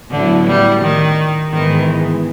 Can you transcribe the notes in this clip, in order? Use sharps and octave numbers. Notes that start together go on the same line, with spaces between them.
A2 D3 F#3 B3 E4
G3
D#3
G#2 D#3 E3 G#3 B3